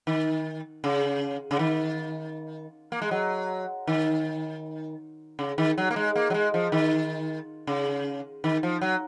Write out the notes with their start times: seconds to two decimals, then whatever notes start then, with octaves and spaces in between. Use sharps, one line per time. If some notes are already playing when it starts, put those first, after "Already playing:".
0.07 D#3
0.84 C#3
1.51 C#3
1.59 D#3
2.92 A#3
3.02 G#3
3.11 F#3
3.87 D#3
5.39 C#3
5.58 D#3
5.78 F#3
5.91 A#3
5.96 G#3
6.15 A#3
6.30 F#3
6.34 G#3
6.54 F3
6.72 D#3
7.67 C#3
8.44 D#3
8.63 F3
8.81 F#3